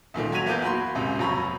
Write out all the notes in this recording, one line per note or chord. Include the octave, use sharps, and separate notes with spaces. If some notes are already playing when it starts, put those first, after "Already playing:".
C#2 A#2 D#3 A3
F#3 F#4 G#6 B6 D#7 F7
E2 A#3 B3 E4 G6
F#4 B5 C6
D#1 C#2 F#2 C3
F1 F2 F#3 A#5 B5 C#6